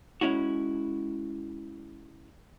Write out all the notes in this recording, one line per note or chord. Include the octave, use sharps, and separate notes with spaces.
G#3 C#4 E4 F#4